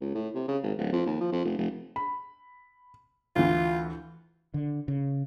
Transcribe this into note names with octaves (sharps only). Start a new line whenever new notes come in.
C#2
A2
C3
C#3
G#1
D1
F2
D#2
F3
F2
F1
F1
B5
D2 E3 F4
D3
C#3